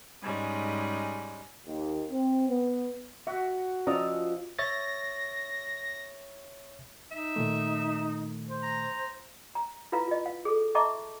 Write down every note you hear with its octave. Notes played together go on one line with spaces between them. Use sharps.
G#2 G3 G#3 C#4
D#2
C4
B3
F#4 E5
F3 C#4 D5 D#5 A#5 E6
C#5 E5 A6 A#6
D#4 E5
A#2 D#3 A3
C5
A#5
A#5
E4 F4 B4 F5 A#5
F4 D#5
F5
G#4 A4
D#5 E5 A5 A#5 C#6 D6